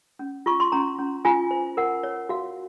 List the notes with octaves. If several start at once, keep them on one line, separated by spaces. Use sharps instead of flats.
C#4
F4 C#6
C6
C#4 A#5
C#4
F4 G#5
C5
A#4 F#5
C#5
F#4 F5